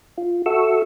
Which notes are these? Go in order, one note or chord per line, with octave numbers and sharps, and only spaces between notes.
F4
F#4 A4 E5 C#6 E6